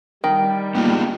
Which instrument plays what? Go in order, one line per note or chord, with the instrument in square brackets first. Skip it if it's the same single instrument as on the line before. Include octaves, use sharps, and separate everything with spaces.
[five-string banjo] D#3 [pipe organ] G3
[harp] A#3 A#4 [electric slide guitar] B3 D#4 F4